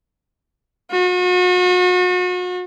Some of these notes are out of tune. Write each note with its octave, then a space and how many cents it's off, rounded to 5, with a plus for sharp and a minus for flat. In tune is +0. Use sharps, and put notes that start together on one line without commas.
F#4 -40